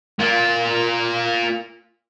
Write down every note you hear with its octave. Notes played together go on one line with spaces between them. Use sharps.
A#3 F4